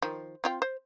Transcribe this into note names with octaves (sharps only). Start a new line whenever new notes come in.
D#3 F3
C4 F4 G5
C5